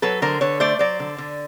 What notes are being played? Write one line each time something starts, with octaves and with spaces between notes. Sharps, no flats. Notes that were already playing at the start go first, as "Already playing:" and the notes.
F#3 A4 B4
D3 A#4 C5
D3 B4 C#5
A3 C5 D5
F#3 C5 D5
D3
D3